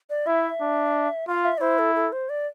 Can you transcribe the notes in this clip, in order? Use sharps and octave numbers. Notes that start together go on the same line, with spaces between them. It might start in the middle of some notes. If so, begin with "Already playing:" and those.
D5
E4 E5
D4
F4 F5
E5
D5
E4 C5
A4
A4
C5
D5